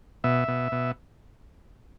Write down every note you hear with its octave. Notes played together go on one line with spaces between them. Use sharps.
B2 E5
B2
B2